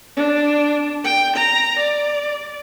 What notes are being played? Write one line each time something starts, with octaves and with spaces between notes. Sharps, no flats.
D4
G5
A#5
D5